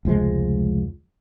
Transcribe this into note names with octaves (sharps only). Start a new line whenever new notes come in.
F1 C#2 F3 G#3